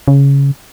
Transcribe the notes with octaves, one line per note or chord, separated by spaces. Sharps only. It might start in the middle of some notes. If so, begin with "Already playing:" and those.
C#3